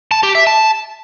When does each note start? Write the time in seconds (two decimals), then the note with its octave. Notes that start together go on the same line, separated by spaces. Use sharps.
0.11 A5
0.23 G4
0.35 E5
0.47 A5